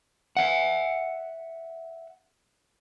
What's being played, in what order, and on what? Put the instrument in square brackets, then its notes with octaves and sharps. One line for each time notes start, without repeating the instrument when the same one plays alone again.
[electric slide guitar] E5 F#5